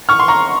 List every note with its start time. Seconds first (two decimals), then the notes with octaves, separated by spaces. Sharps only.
0.09 C#6 F6
0.20 C6
0.28 A#5 C#6